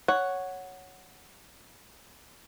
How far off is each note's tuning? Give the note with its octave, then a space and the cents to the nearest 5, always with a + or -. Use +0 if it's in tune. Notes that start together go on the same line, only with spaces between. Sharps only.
C#5 +0 F#5 +0